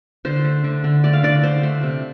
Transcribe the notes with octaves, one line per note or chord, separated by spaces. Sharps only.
D3 C5
A3
D3
D3
A3 D5
F5
D3 D5
A3 C5
A3
C3